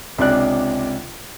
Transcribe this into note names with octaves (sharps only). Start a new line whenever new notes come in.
C#2 C3 D4 D5 F#6